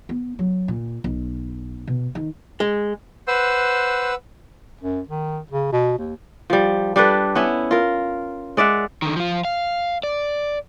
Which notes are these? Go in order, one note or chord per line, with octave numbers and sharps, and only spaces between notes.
B3
F#3
A#2
B1
B2
D#3
G#3
B4 C5 F#5 E6
F#2
D#3
C#3
B2
D#2
F3 G3
G3 D4 A4 B4
B3 C#4 E4
F4 A#4
G#3 D5 E5 F#5
D3 D#3
F3 F4
F5
D5